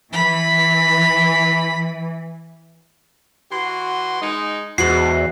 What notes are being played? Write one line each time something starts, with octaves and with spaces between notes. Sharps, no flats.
E3 B5
E3 F#4 C6
G#3 D#4
E2 G#2 F#4 C7 F#7